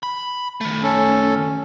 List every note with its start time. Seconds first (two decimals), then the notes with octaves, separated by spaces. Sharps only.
0.03 B5
0.61 D#3 A3
0.83 C#4 A4